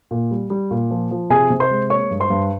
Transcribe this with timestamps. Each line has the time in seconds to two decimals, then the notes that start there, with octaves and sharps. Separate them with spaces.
0.11 A#2
0.31 G3
0.50 G3
0.71 A#2
0.91 F3
1.11 F3
1.30 C3 G#4 G#5
1.50 C3
1.60 C5 C6
1.71 G#3
1.90 A#3 C#5 C#6
2.11 G2
2.20 C5 C6
2.30 G2